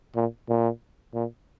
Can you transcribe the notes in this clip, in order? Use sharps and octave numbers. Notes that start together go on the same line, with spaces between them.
A#2
A#2
A#2